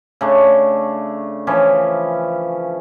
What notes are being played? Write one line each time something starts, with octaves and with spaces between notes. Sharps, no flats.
C#3 A3 D4
E3 F3 C#4